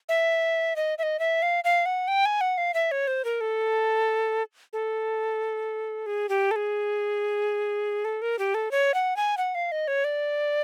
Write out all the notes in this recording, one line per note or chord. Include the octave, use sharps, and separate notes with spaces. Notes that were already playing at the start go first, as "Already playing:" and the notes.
E5
D#5
E5
D#5
E5
F5
F5
F#5
G5
G#5
F#5
F5
E5
C#5
C5
A#4
A4
A4
G#4
G4
A4
G#4
A4
A#4
G4
A4
C#5
F#5
G#5
F#5
F5
D#5
C#5
D5